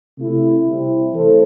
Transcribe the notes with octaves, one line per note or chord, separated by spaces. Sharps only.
C3 A3 E4
C3 G3 C4 E4
E3 A3 E4 A4 C5